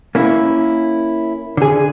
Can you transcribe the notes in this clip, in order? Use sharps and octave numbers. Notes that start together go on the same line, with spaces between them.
A#3 C#4 E4
D3 G#4